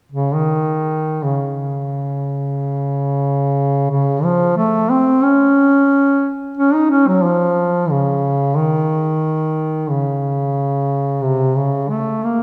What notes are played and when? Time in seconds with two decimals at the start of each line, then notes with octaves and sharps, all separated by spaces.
0.12 C#3
0.34 D#3
1.24 C#3
3.91 C#3
4.24 F3
4.57 A3
4.91 C4
5.23 C#4
6.57 C#4
6.74 D#4
6.91 C#4
7.07 F#3
7.24 F3
7.90 C#3
8.57 D#3
9.90 C#3
11.23 C3
11.57 C#3
11.90 A3
12.24 A#3